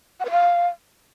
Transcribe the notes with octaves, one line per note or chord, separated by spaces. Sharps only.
F#5
B4
F5